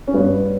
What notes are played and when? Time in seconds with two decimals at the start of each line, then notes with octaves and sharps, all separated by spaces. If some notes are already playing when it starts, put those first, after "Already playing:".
0.07 C#4
0.14 G2 B3